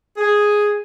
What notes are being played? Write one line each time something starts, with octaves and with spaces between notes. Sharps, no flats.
G#4